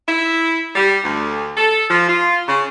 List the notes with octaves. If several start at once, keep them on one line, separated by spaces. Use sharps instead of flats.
E4
G3
D2
A4
F3
F4
C#3